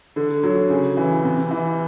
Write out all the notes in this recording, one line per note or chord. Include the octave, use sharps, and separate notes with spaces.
D3
F#3
C#3
E3
C3
E3